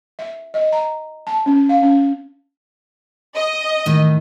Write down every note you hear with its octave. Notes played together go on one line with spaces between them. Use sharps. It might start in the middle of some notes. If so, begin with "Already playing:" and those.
E5
D#5
A#5
A5
C#4
F5
C#4
D#5
A2 D#3